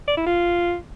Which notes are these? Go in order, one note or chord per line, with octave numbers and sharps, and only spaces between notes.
D5
E4
F4